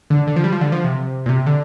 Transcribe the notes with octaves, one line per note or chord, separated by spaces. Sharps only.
D3
D3
F3
G3
F3
D3
F3
C3
A#2
C3
D3